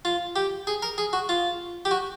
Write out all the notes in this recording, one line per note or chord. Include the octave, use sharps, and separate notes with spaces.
F4
G4
G#4
A#4
G#4
F#4
F4
G4
F#4